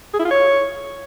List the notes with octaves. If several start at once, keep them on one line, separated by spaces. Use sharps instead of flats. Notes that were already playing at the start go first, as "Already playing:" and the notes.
G#4
E4
F4
C#5